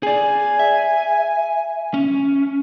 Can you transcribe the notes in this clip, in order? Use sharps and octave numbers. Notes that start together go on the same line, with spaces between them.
G#4 D5 G#5
E5
C#4